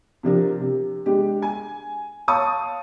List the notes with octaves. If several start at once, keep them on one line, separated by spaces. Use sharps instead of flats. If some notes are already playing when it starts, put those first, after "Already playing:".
C3 F3 D4 A#4
C3
G#3 D4 G4
G#5
C#5 F5 A5 C#6 D#6